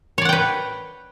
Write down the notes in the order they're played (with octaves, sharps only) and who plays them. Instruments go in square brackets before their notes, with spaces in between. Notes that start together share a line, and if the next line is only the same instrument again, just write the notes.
[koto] C#5
D5
F#5
G5
B4